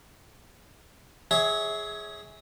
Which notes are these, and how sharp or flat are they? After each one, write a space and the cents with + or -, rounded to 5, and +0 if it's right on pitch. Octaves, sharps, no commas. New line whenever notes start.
G#4 +0 C#5 +15 E5 -30